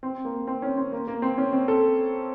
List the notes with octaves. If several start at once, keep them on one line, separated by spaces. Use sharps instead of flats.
C4
A#3
C4
C#4
C4
A#3
A#3
C4
C#4
C4
A4